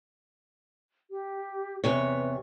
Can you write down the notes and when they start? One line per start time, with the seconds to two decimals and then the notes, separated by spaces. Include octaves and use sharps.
1.11 G4
1.84 E2 C3 B4 C#5